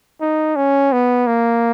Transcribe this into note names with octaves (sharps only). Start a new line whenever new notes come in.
D#4
C#4
B3
A#3